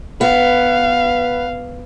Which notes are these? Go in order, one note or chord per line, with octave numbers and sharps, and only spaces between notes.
B3 F5